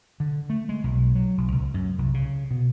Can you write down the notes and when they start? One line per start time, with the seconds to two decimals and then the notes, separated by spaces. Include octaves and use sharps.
0.20 D3
0.50 A3
0.69 G#3
0.84 B1
1.15 F#3
1.38 B1
1.52 C#2
1.74 F#2
1.98 C2
2.14 C#3
2.51 B2